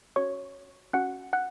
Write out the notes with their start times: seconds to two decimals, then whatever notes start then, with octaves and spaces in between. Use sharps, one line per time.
0.16 C#4 F#4 C#5 C#6
0.93 C#4 F#4 F#5 F#6
1.33 F#5 F#6